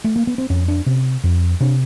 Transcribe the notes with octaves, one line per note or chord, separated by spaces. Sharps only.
A3
A#3
B3
C4
F2 C#4
D4
C3 C#4
F2
C3 D4